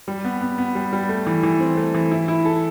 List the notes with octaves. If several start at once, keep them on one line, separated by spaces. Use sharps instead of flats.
G3
B3
B3
B3
G3
G3
A3
E3
E3
C4
A3
E3
E4
E4
A4